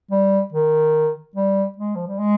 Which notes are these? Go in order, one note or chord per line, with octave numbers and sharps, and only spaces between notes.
G3
D#3
G3
G#3
F3
G3
G#3